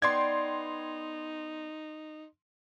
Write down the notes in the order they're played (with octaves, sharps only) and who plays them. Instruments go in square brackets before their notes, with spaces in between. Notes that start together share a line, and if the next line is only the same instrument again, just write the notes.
[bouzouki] B3 D5 G5 [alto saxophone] D#4 [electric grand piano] C6 G#6